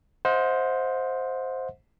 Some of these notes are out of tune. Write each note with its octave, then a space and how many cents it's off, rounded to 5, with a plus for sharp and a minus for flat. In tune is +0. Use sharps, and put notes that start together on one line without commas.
C5 +0 D#5 +35 F#5 -45